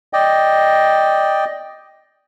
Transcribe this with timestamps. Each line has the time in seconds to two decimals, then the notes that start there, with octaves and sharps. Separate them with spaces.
0.13 D5 D#5 G5